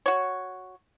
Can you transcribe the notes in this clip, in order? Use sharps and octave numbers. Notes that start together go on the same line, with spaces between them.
F#4 C#5